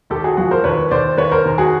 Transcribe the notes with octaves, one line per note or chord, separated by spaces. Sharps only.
D#2 G4 A4
F#4 G#4
F3 F#4 G#4
A#4 C5
D#2 B4 C#5
D#2 C5 D5
D#2 B4 C#5
A#4 C5
D#2
F#4 G#4